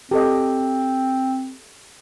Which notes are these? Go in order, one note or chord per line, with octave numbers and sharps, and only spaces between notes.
C4 G4 A4 D#5